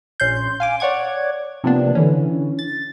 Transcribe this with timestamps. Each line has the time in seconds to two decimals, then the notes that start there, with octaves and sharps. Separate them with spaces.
0.20 A#1 C#4 C6 G6
0.60 F5 G#5 D6
0.80 C#5 D5 F#5 D6 G#6
1.64 C3 F3 A#3 B3 D4
1.95 D3 E3 C#4
2.59 A6